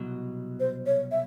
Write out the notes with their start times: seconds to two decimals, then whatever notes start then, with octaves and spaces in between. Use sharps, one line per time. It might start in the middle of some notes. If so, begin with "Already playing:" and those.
Already playing: C2 B2 F#3
0.60 C5
0.86 C#5
1.12 E5